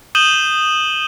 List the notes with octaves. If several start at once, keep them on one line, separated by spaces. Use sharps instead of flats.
D#6 G6 D#7 E7 F#7 G7